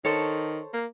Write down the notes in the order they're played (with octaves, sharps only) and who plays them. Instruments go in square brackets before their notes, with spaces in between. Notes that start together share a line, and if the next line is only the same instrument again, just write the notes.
[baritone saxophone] D#3 [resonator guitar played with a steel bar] A4 C5 C#5
[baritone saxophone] A#3